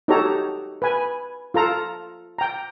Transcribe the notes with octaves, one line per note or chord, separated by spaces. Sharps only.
D#4 F#4 G4 A4 C#5 A#5
B4 G#5
F4 A4 A#5
G5 A#5